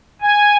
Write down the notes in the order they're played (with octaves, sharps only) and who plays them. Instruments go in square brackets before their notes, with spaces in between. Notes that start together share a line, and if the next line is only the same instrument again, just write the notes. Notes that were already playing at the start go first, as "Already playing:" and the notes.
[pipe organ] G#5